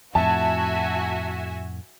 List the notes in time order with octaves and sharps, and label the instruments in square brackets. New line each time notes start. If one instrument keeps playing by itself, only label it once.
[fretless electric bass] F2 A2 [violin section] F#4 E5 G#5 [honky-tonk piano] A5